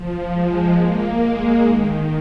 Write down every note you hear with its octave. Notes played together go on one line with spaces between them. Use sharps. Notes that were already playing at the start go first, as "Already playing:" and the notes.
Already playing: F3
G#3
A#3
G#3
D#3